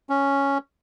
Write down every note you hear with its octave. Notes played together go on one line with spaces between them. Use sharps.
C#4